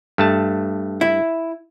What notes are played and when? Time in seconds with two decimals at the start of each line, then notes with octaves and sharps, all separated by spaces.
0.18 G2 A3 A5
1.01 E4